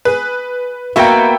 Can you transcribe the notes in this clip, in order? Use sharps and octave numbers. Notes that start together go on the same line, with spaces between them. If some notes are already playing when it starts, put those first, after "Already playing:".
G#4 B4
A#3 B3 D#4 F#4 A#4 E5 G5 B5